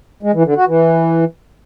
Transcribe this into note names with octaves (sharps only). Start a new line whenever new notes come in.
G#3
E3
D3
F#4
E3